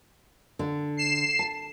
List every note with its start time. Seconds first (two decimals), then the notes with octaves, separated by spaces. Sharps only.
0.59 D3
0.97 C7 E7
1.39 A5